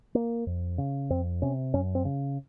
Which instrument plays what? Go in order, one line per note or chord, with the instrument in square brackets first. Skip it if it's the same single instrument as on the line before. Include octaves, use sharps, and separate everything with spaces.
[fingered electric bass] A#3
F2
C#3
F2 C4
C3 C#4
F#2 C#4
C4
C#3